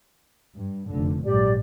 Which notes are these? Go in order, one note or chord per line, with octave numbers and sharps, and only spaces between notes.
G2
F1 D3
A#1 G#2 F#3 G4 D5